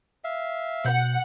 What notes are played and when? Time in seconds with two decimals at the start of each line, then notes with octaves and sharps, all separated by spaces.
0.24 E5 F5
0.85 B2 F#5 G6